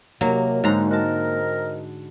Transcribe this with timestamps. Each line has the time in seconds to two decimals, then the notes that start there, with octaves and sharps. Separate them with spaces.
0.21 D#2 C3 F#3 A#3
0.64 G#2 D3 F#3 G#3 D#4 A#5
0.91 C4 D#4 F#4 A#4 A5